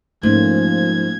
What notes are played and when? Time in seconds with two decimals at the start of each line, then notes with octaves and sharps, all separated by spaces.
0.23 G#2 F3 A3 A#3 C#4 G#6